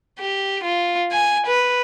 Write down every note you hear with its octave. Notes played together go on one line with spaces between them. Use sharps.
G4
F4
G#5
B4